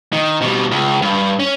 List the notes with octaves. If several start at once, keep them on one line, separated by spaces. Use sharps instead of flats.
D#3
B2 G3
C#2
G2
C#4